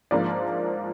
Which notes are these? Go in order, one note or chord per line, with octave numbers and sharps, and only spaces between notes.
G#2 F3 A#3 D4 D5